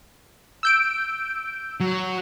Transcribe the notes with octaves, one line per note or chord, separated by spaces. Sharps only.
E6 G6 D7
F#3